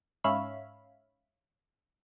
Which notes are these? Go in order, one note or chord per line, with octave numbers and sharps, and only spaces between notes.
G#2 C#4 C#5 E5 F5 B5